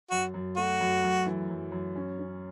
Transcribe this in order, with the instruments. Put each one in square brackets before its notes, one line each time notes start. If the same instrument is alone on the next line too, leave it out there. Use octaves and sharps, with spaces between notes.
[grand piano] F#2 [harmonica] F#4
[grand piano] F#2
[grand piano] A3 [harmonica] F#4
[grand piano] F#2
F#2
E3
F#2
F#2
C#4
C#4